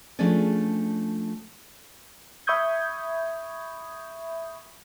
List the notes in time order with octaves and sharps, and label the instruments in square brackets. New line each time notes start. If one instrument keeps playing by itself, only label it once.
[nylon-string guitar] F3 A3 C#4 D4 G#4 D5
[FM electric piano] E5 B5 C#6 D#6 G6 G#6